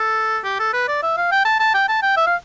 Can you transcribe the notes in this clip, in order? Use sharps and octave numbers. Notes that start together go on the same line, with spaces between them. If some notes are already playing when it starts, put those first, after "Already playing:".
Already playing: A4
G4
A4
B4
D5
E5
F5
G5
A5
A5
G5
A5
G5
E5
F5